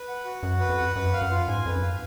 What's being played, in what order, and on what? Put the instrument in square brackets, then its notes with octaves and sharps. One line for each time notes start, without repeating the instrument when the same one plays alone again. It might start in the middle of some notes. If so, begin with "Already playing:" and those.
Already playing: [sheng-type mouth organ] B4
F#5
F#4
[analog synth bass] F#2 [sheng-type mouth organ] F#4
[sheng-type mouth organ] B4
[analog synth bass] F2
[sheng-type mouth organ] F#5
[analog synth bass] F#2 [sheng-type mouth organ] B4
[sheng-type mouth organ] F5
[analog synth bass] F#2
[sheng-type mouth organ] F4
[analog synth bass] G#2 [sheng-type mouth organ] G#5
[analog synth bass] F2 [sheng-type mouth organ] B4
[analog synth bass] F#2
[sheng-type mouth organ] F5